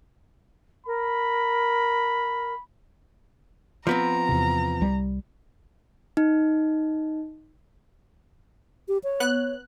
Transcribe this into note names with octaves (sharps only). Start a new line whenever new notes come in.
A#4 B5
F3 B3 C4 A#5
E2 C3
C2 G3
D#4
G4
C#5
B3 F#6